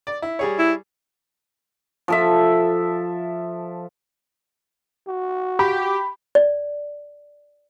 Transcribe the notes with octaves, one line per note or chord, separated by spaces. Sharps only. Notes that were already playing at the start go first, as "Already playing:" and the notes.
D5
E4
G3 G#4 C#5
E4
F3 A4 E5
F#4
G4 B5
D5